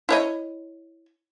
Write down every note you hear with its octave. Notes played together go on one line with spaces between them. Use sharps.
E4 C#5 D#5